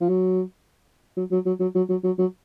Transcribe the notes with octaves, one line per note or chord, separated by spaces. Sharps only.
F3
F#3
F#3
F#3
F#3
F#3
F#3
F#3
F#3
F#3